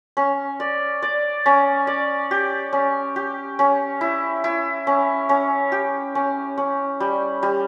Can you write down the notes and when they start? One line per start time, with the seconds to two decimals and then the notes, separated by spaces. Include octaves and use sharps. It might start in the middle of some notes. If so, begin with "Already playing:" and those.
0.17 C#4
0.60 D5
1.02 D5
1.46 C#4
1.87 D5
2.31 G4
2.73 C#4
3.16 G4
3.59 C#4
4.01 E4
4.44 E4
4.87 C#4
5.29 C#4
5.72 G4
6.15 C#4
6.58 C#4
7.00 G3
7.43 G3